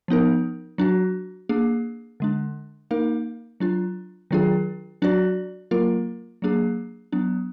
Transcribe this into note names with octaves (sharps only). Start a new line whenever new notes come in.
F3 B3 D#4 A#4
F#3 D4 F#4
A#3 D4 G#4
D3 G#3 D4
A#3 D#4 A#4 F5
F#3 D4 F4
D#3 F#3 D4 F4 G#4
F#3 D4 F#4 D5
F#3 A#3 F4 A#4
F#3 A#3 D4 G#4
F#3 B3 D4